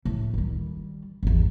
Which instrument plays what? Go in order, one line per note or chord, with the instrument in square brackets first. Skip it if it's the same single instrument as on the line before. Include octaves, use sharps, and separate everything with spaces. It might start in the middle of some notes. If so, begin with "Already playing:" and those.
[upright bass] A2
D#3 G3
G#1 E2